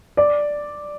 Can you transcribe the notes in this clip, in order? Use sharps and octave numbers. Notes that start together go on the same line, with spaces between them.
D5